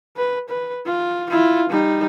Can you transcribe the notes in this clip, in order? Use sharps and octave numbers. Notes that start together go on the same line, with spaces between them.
B4
B4
F4
E4 F4
G3 D#4